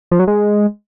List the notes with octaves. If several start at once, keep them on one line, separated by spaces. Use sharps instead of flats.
F3
F#3
G#3